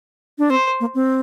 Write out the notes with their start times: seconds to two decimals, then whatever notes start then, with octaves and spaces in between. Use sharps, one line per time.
0.38 D4
0.50 C4 C5
0.80 A#3
0.95 C4